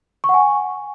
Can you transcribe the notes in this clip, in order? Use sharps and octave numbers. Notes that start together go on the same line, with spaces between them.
C#6
F#5
G#5